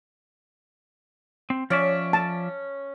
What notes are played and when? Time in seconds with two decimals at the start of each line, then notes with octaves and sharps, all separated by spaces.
1.50 C4
1.70 F3 C#4 D5 E5
2.13 A5